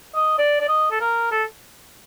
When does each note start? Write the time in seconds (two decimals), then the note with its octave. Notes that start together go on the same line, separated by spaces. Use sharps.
0.15 D#5
0.38 D5
0.60 D5
0.68 D#5
0.91 A4
1.01 A#4
1.31 A4